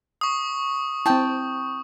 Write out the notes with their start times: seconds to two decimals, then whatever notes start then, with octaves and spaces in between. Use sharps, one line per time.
0.21 C#6 D#6
1.06 C4 E4 G5 A5